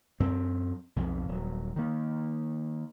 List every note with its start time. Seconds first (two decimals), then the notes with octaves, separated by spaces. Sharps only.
0.20 F#2 C4
0.96 B1 F2
1.28 D#1 F#3
1.76 D#3 A#3